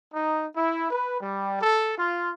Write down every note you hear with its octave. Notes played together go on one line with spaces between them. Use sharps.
D#4
E4
B4
G3
A4
F4